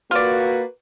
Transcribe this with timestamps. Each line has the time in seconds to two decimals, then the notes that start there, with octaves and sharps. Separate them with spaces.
0.11 A#3 F4 F#4 B4 D5